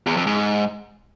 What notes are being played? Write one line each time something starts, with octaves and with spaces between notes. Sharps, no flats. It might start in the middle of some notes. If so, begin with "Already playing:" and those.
E2
F2
G#2